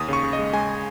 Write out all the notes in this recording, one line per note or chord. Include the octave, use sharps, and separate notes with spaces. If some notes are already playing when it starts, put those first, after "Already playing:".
Already playing: D#2 D#6
C#3 C#6
C#3
D#5
G#3
G#3 G#5